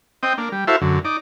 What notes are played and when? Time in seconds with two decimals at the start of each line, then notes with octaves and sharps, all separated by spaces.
0.23 C4 D#5 G5
0.38 A#3 D4
0.52 G3
0.67 E4 F#4 A4 C5 E5 F5
0.81 F#2 D3
1.05 D#4 D5